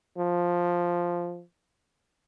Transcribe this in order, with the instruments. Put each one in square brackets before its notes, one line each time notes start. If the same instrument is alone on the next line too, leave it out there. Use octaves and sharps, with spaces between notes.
[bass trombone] F3